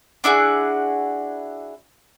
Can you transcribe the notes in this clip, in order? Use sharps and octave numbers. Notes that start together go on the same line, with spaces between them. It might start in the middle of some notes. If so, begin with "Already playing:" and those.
D4 E4 F#4 G#4